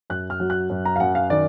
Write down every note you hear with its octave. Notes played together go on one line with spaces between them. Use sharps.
F#2 F#6
F6
F#3
F#6
F#2
A#5
F5
F#2 F#5
F5
D#3 D5